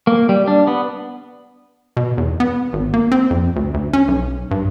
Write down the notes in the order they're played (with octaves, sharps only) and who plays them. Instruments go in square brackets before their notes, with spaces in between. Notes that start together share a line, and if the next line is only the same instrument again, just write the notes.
[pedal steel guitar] A#3
G3
D4
B3
[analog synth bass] B2
E2
B3
G#1
A#3
C4
F2
D2
D2
C#4
B1
G2